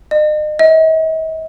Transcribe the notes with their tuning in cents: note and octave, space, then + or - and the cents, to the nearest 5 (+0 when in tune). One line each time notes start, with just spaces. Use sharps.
D#5 -40
D#5 +45